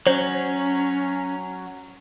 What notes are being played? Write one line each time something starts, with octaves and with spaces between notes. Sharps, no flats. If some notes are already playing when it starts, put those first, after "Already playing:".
F#3 C#4 C5